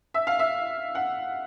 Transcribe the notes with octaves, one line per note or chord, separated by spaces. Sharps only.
E5
F5
E5
F#5